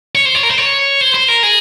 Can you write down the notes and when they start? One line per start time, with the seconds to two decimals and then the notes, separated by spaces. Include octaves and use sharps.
0.15 C#5
0.25 C5
0.35 C#5
0.43 A#4
0.51 C5
0.58 C#5
1.01 C5
1.15 C5
1.28 A#4
1.43 G#4